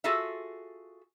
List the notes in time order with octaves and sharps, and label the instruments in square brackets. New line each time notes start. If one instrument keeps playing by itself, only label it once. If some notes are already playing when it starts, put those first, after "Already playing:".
[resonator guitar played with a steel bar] F4 F#4 G#4 A4 E5